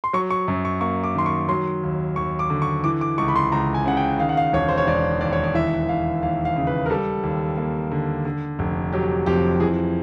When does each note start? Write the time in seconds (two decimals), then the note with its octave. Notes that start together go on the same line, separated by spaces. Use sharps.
0.04 C6
0.13 F#3 C#6
0.30 C#6
0.48 F#2
0.65 C#6
0.81 A#3 C#6
1.04 D6
1.15 D#3 C6
1.26 C#6
1.49 F#3 C6
1.83 D#2
2.16 D#2 C#6
2.39 D6
2.50 D3
2.62 C#6
2.84 E3 D6
3.01 D6
3.18 C#2 C#6
3.28 B5
3.36 C6
3.52 C#2 A#5
3.74 G#5
3.86 C#3 F#5
3.97 G5
4.20 D#3 F5
4.29 F#5
4.37 F5
4.53 E1 C#5
4.69 C5
4.78 C#5
4.87 E1 D5
5.21 D#2 D5
5.33 C#5
5.43 D5
5.54 E3 E5
5.89 D#2 F5
6.23 D#2 F5
6.45 F5
6.56 C#3
6.67 B4
6.86 A#4
6.90 G3 A4
7.23 D#2
7.57 A#3
7.91 D3
8.25 D3
8.59 F1
8.93 F#3 G4
9.26 F2 G4
9.60 E3 G#4